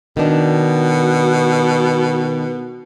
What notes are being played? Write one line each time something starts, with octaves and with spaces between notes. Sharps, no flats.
B2 D#3 D4